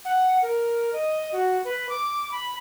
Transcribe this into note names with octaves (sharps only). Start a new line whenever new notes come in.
F#5
A#4
D#5
F#4
B4
D6
B5